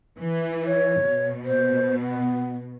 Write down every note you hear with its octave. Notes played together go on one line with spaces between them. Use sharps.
E3
C#5
B2
C5
B3